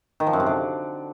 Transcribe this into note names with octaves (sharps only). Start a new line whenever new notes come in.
D#3
F3
F#2
C3
D3